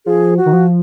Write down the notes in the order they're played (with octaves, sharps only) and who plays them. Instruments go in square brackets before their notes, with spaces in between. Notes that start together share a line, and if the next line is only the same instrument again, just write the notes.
[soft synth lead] F3 [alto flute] G#4
[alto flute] F#4
[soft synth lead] D#3
F3